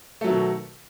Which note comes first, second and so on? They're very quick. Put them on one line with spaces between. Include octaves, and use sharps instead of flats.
A3 F#3 D#3 B2